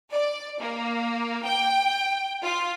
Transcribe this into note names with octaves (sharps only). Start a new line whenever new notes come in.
D5
A#3
G5
F4